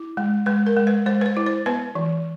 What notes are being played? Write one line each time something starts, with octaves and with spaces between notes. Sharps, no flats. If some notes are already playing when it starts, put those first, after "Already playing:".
Already playing: E4
G#3
G#3 B4
A#4
G#3
B4
G#3 C5
B4
C5
E4
C5
B3 B4
E3